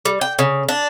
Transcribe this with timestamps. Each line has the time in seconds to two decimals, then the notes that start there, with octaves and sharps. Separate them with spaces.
0.05 G3
0.21 G5
0.39 C#3
0.69 D4